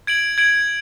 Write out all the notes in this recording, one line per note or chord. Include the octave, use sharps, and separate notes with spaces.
G#6 D7 F#7
G#6 D7 F#7